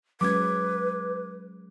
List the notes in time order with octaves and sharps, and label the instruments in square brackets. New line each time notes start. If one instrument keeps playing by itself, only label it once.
[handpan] F#3 G#3 C#4 [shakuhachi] B4 [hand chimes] D6 G#6